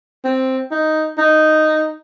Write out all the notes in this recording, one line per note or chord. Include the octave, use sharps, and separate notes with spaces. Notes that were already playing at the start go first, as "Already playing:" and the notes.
C4
D#4
D#4